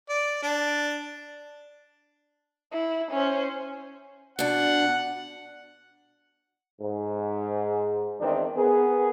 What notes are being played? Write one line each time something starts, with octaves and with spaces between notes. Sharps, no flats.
D5
D4
E4
C#4 C5
B2 D4 F#5
G#2
E2 D#3 E3 C4 D4 D#4
B3 G#4 A#4